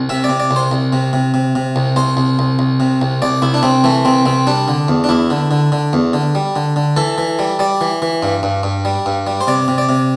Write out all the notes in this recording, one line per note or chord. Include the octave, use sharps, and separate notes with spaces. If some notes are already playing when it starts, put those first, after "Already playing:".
Already playing: C2
C3 E5
D5
C3
D5
C2
C5
C2
C3
C3
C3
C3
C2
C2 C5
C2
C2
C2
C3
C2
C2 D5
C2 E4
D4
C2 C4
E3 A3
C2 C4
C2 C4
G3 D4
D3
E2
D4
E2 E4
D3
D3
D3
E2
D3
G3
D3
D3
E3 A4
E3
G3
G3 D5
E3
E3
G2
G2
G2
G3
G2
G3
C5
C3 D5
C3
D5
C3